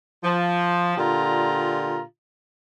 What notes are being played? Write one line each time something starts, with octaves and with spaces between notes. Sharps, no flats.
F3
A#2 D3 F4 G4 A#5